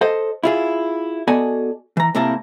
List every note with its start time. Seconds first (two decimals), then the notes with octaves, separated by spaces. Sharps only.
0.01 A4 C5 D#5
0.44 E4 F4 G#4
1.28 B3 F#4 A4 D5 D#5 G#5
1.97 E3 A#5
2.15 A2 C3 A#3 E4 A#4 A5